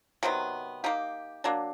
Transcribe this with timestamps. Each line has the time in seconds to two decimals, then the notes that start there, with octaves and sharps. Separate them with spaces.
0.23 C3 D#3 F#3 B3
0.84 A#3 D#4 G4
1.44 F#3 A#3 D4